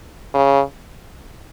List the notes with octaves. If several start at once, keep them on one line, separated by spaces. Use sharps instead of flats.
C#3